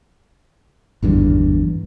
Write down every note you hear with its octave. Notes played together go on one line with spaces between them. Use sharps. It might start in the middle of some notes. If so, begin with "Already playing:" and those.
G#1 E2 G2 D3